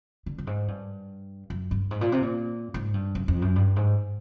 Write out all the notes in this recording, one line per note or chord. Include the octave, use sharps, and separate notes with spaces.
D3
G2
G#2
G2
F#2
G2
G#2
A#2
C3
A#2
G#2
G2
F#2
F2
F#2
G2
G#2